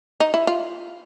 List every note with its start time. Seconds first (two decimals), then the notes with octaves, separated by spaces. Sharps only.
0.20 D#4
0.34 E4
0.47 F4